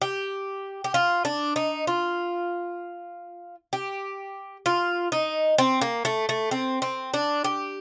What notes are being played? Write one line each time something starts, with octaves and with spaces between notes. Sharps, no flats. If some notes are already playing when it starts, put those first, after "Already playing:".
G4
G4
F4
D4
D#4
F4
G4
F4
D#4
C4
A#3
A3
A3
C4
C4
D4
G4